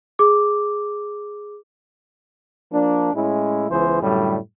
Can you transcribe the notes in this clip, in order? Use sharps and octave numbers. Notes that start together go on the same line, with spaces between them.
G#4 D6
F3 A#3 D4
A2 G#3 C#4 E4
C#2 E3 B3 G#4 C5
F#2 A2 D3 G3